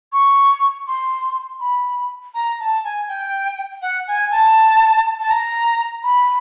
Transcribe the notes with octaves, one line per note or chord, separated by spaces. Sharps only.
C#6
C6
B5
A#5
A5
G#5
G5
F#5
G#5
A5
A5
A#5
B5